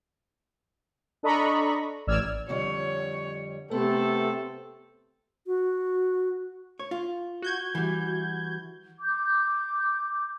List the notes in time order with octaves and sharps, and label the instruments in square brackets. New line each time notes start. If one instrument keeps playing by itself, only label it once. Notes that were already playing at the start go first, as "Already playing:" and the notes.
[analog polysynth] D4 A4 D#5 A#5 B5 C#6
A1 D5 E6 F6 G#6
[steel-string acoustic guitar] F2 D3 G3 [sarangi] C#5
[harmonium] C3 A3 [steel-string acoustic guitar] B3 [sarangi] C4 [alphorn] A4
[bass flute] F#4
[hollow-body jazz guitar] C#5
F4
[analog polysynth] F#4 G6 G#6
[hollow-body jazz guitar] E3 G3
[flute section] D6 G6